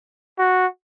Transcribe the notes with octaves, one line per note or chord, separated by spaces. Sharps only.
F#4